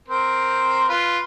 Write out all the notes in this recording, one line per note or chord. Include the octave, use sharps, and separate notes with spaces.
C4 A#4 C5
F4 B4